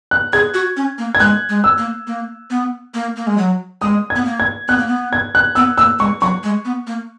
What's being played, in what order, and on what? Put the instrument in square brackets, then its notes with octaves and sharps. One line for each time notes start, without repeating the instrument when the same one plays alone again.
[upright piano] F#6
[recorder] G#4 [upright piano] G#6
[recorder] F#4
C#4
A#3
[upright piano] G#6
[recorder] G#3 [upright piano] F#6
[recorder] G#3
[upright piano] E6
[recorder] A#3
A#3
B3
A#3
A#3
G#3
F#3
[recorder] G#3 [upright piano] D#6
[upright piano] G#6
[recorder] B3
A#3
[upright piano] G#6
[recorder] B3 [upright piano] F#6
[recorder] A#3
B3
[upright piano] G#6
F#6
[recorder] B3 [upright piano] E6
[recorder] A#3 [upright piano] E6
[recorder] G#3 [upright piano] C#6
[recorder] F#3 [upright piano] C#6
[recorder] G#3
B3
A#3